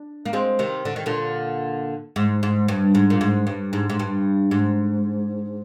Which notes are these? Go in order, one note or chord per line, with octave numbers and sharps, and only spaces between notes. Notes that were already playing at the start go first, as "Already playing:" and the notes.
Already playing: D4
A#3
G#3 C4
C3 D#3
D3
D#3
A#2 D3
G#2
G#2
G2
G#2
A#2
G#2
G2
G#2
G#2
G2
G#2